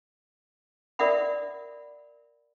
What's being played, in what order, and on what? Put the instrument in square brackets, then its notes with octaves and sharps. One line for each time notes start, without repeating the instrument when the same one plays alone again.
[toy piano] A#4 D5 E5 F#5 B5